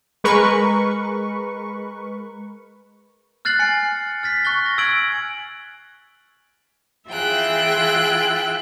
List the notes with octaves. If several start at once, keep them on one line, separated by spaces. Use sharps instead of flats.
G#3 A#4 B4 C#6
F6 F#6 A6 C7 F#7
G#5 C7 C#7
F6 A6 B6 C#7
C#6 F#6 A6 G7
A#6
E6 G#6 D7 F#7
E3 F4 G#4 E5 G5 F#6